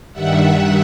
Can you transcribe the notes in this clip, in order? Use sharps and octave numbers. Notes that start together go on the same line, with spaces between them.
G2 D#3 G3 E5 F#5